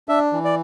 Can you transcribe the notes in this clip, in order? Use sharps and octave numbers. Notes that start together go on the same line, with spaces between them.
D4 E5
E3
D5